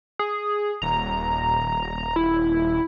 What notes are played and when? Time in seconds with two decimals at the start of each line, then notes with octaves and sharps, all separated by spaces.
0.19 G#4
0.82 D#1 A#5
2.16 E4